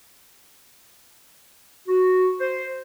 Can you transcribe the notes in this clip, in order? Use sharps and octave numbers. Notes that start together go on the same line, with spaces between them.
F#4
C5